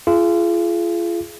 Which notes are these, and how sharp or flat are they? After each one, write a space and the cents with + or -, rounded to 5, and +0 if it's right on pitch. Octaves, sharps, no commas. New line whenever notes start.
F4 -35 G#4 +25